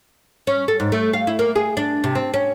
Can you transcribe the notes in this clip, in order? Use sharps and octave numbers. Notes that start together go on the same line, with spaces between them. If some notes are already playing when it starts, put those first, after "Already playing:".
C#4
A4
G#2
A3
F5
E4
A#3
G#4
D4
C3
C4
C#4